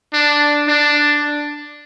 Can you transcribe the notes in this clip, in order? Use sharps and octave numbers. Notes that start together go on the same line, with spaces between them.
D4
D4